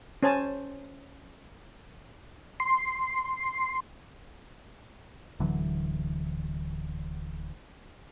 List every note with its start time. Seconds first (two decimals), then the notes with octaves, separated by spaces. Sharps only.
0.23 C#4 C5 G#5 A5
2.60 C6
5.40 D1 D3 E3 F#3